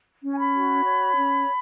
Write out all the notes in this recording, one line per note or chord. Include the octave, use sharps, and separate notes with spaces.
C#4
G#5
B5
F#4
C#5
C#4